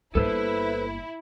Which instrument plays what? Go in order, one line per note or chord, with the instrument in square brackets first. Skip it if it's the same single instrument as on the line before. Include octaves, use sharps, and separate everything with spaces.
[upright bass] G1 A#3 [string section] E4 [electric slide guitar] A4 B4 C5